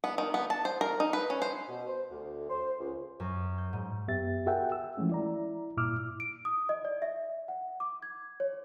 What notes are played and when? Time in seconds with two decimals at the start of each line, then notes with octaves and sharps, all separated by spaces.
0.04 B3
0.18 D#3
0.34 B3
0.50 A5
0.65 C5
0.81 A#4
1.00 D#4
1.13 B4
1.30 C#4
1.42 C5
1.68 B2
1.87 C5
2.11 D2
2.50 C5
2.79 C#2
3.20 F#2
3.58 G6
3.73 G#2
4.08 F#2 B3 G4 E5 A6
4.46 F#4 G#4 A#4 E5 F#5 G5
4.72 E6
4.97 E3 F3 G#3 A3 C#4
5.10 E4 D5 A#5
5.77 G2 A#2 E4 D6 E6 F6
6.20 D7
6.45 D#6
6.69 D#5
6.85 D5
7.02 E5
7.48 F#5
7.80 D6
8.03 G#6
8.40 C#5